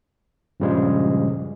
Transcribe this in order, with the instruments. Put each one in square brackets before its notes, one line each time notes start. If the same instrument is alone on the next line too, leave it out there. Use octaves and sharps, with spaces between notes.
[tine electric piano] G2 A#2 C#3 F3 G3 G#3